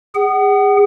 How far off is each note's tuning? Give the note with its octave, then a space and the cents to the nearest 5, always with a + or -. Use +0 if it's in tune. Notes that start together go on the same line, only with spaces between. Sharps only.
G#4 -30 F#5 +35